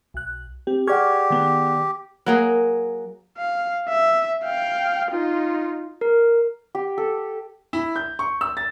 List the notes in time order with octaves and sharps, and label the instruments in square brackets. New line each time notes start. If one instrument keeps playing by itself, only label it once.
[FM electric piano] B1 F#6
[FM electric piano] C4 [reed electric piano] G4
[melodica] G4 [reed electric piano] G#4 D5 F#5 [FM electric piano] C#6 F6 G#6
[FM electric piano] D#3 B3
[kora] F#3 A#3 G#4
[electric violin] F5
E5
F5 G5
D#4 F4
[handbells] A#4
[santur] G4
A4
[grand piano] E4
G6
C#6
E6
A6